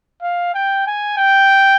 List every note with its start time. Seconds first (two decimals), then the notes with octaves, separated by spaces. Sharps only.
0.22 F5
0.54 G5
0.87 G#5
1.18 G5